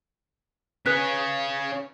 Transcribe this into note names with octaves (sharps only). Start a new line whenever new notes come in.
C#4 G#4 B4 F#6 B6